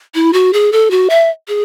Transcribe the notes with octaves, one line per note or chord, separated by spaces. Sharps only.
E4
F#4
G#4
A4
F#4
E5
G#4